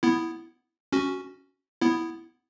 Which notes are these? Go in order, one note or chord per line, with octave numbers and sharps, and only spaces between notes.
B3 E4
C#4 F#4
B3 E4